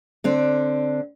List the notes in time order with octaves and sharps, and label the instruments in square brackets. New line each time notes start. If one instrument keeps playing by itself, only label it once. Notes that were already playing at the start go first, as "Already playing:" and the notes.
[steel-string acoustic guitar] D3 C4 D4